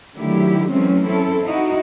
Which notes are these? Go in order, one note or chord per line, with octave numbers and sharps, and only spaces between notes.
D3 D#3 F#3 A3 E4 G4
E3 F#3 G#3 A3 C4 C#4
C4 C#4 E4 A4
D#4 E4 F#4